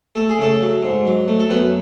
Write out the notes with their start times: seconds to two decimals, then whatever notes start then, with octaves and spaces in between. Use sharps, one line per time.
0.15 A3 A4
0.29 G#4
0.38 C#3 A3 A4
0.61 F#3
0.83 G#2
1.05 F#3
1.28 A3
1.39 A4
1.49 F#2 B3 B4